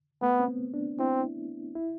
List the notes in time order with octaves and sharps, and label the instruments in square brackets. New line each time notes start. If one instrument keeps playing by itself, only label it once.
[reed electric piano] A3 [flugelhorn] B3
[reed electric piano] C4
B3
D4
[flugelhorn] C4 [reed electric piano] E4
[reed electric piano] E4